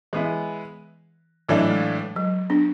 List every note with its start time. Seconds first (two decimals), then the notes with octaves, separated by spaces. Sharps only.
0.13 E3 G#3 B3 E4
1.49 A2 E3 F#3 A3 D4
1.71 G#3
2.16 F#3
2.50 B3 D4